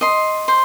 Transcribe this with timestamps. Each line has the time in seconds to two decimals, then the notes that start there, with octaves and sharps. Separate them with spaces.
0.01 D#5 C6
0.48 C5